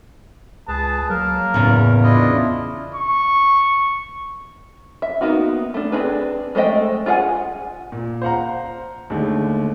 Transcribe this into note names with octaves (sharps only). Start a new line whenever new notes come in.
C#2 G#4 B4 A5
F#3 A#3 A#4
E2 A2 C#3
D4 E4 F4 D#5
C#6
E5
A#3 B3 D#4 F#4
A3 D4
C4 D4 D#4 G#4 B4
G#3 A3 C5 D#5 G5
F4 G#4 E5 F#5 G#5
A#2
C5 F5 F#5 A#5
D#2 D3 G#3 A3